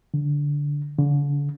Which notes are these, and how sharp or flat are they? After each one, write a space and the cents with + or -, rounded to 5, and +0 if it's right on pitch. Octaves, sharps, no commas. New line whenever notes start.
D3 -15
D3 -40